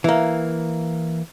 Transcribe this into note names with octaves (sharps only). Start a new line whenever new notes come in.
E3 A#3